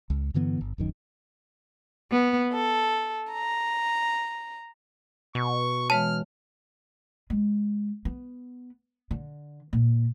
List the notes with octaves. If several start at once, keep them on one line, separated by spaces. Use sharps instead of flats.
C#2
G2 D3 E3 B3
G1
D1 F#2 D#3
B3
A4
A#5
B2 C#6
E3 G#3 C#5 A5 F6
G#3
B3
D3
A#2